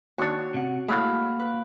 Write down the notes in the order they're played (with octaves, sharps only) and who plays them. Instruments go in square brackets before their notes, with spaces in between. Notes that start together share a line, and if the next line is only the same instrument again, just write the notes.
[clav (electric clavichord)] D#2 D4 [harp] F#4 C#5
[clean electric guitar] C3 F#5
[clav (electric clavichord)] A2 F#3 G#3 [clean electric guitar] A#3 F#4 [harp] F5 B5
[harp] B4